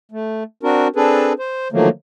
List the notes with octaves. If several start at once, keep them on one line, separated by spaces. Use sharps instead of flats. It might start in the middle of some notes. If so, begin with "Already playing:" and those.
A3
C4 D4 F#4 A#4
C4 D4 G#4 A4 B4
C5
D3 D#3 F3 F#3 A3 A#3